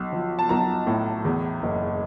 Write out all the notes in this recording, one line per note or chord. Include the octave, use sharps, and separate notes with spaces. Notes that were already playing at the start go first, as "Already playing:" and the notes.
Already playing: B1
F3
A5
B1 A#5
A2
E2
F#1